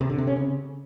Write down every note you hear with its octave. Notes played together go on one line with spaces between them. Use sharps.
C3
D3
C3
C#4
C#3